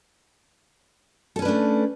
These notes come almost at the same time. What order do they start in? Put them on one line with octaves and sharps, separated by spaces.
A4 C#4 B4 D4 A3